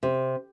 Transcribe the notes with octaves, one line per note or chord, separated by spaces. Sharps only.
C3